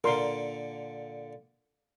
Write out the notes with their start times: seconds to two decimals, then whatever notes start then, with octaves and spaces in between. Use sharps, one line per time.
0.04 A#2 D3 A#4 C6